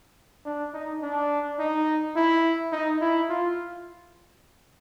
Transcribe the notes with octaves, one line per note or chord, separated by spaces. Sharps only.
D4
D#4
D4
D#4
E4
D#4
E4
F4